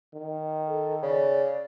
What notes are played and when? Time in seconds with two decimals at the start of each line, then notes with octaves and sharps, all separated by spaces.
0.14 D#3
0.68 A4
1.03 C#3 D5